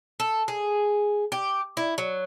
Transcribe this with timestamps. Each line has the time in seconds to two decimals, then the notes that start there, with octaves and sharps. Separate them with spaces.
0.20 A4
0.48 G#4
1.32 G4
1.77 E4
1.98 F#3